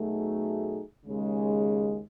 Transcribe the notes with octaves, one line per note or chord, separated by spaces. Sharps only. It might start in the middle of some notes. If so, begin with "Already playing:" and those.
Already playing: B2 F#3 A3 D#4 G#4
D#2 C#3 G#3